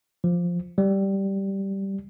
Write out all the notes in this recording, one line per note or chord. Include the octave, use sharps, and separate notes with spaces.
F3
G3